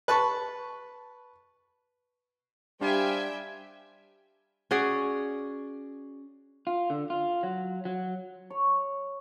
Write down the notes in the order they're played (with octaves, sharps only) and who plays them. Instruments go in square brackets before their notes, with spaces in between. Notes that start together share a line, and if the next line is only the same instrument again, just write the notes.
[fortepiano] B4 A5 C#6
[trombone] G3 [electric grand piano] D4 G4 [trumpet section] C5 F5 G#5 [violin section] E5 G5
[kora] C#4 F#4 G#4 D5
[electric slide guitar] F4
D3
F4
F#3
F#3
[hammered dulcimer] C#5